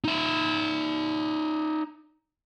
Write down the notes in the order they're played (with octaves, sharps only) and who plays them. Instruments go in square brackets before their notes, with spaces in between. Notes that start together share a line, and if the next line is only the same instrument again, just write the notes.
[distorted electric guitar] D#4 E5